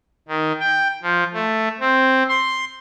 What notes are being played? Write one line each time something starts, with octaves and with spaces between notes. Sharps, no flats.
D#3
G5
F3
A3
C4
C6